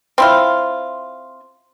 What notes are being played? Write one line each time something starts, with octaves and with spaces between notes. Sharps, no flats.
C4 E4 F4